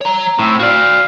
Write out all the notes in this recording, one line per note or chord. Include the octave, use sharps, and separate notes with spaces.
C#5 A#5
A2 C4
F#4 D5 F5